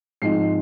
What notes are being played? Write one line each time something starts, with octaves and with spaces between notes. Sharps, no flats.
G#2 F3 C4 D#4 C7